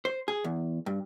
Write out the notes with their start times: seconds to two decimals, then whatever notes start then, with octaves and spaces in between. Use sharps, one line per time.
0.05 C5
0.28 G#4
0.44 E2
0.86 G2